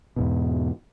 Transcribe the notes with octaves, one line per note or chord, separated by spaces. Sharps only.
E2 G#2 B2